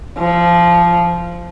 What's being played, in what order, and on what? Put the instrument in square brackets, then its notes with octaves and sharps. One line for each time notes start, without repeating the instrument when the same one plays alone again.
[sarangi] F3